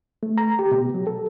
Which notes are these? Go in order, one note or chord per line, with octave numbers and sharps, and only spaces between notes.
A3
A#5
G4
B2
F#3
A4